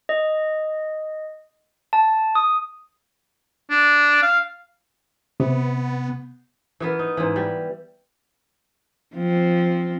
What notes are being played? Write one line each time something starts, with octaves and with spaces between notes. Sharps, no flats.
D#5
A5
D#6
D4
F5
C3 B3
E3 B3 A#4
D#4
G#2 E3
G3
F3 C4